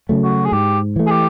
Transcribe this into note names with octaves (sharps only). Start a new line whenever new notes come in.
C#3 F#3 A3
F#4
G#4
G#2 G4
E3 A3
G#4
G4